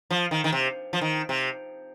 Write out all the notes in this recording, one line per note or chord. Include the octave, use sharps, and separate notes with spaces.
F3
D#3
D#3
C3
F3
D#3
C3